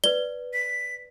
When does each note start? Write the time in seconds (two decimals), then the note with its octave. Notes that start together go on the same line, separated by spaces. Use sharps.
0.04 B4 D5 G7
0.53 B6